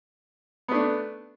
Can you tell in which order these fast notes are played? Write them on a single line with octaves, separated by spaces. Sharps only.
B3 A3 D4